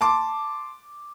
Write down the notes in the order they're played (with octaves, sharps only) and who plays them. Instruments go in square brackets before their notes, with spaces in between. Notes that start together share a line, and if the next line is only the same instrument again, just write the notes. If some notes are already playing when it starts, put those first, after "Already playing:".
[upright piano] A5 C6 D6